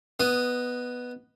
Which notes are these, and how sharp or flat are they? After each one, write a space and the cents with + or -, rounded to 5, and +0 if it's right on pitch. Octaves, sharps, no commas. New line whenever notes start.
B3 +0 D#5 +0